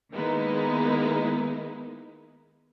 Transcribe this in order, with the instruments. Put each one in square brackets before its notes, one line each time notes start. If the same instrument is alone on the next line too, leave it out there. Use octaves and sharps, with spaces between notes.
[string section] D#3 G#3 A#3 B3 D#4 E4